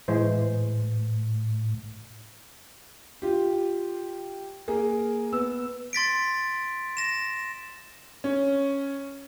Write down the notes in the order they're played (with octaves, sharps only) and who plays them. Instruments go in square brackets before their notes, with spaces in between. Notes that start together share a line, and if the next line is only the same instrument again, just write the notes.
[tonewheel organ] A2 [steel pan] E3 G#3 C5
[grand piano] F4 G4
A#3 G#4 A#4
B3 E6
[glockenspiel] C6 A6 B6 D7
A#6 E7
[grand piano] C#4